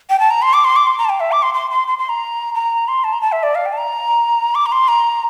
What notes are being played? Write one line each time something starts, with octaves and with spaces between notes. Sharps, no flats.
G5
A5
A#5
C6
D6
C6
D6
C6
A#5
A5
G5
E5
D6
C6
C6
C6
C6
C6
A#5
A#5
C6
A5
A#5
A5
E5
D5
F5
G5
A5
A#5
D6
A#5
C6
A#5